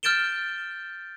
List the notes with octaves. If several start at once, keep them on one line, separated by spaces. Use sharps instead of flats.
F6 G6 A6 D7 E7 G7